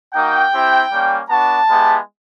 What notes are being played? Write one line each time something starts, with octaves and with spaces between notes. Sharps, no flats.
A#3 D#4 F#4 G5
C4 E4 G4
G3 A#3 C#4
B3 D4 F#4 A5
G#3 B3 E4 G4